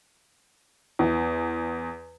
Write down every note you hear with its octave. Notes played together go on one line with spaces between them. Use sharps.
E2